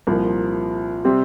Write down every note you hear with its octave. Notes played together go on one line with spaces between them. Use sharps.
C2 A#2 F3 A#3
C3 G3 C4